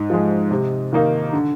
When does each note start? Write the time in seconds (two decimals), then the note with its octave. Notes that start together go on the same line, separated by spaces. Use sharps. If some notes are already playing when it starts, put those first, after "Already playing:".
Already playing: G#2
0.10 F3 G#3
0.51 C3
0.93 D#3 A#3 D#4
1.33 D3